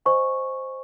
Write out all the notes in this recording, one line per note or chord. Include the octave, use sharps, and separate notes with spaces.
C5 D#5 G#5 C#6